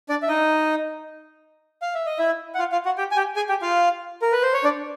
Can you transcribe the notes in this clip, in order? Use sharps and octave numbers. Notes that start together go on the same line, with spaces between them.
D4 D5
E5
D#4 D#5
F5
E5
D#5
E4 E5
F#5
F4 F5
F4 F5
F#4 F#5
G4 G5
G#5
G4 G5
G#4 G#5
G4 G5
F4 F5
A#4
B4
C5
C#5
D4 D5